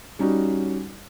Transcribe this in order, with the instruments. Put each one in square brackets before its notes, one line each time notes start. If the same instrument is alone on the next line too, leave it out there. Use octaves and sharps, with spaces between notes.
[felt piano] G3 C#4 D#4 F#4